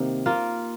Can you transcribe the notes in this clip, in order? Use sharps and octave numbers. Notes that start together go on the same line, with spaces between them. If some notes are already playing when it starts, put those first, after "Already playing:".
Already playing: C3 D#3 A#3
A#3 F4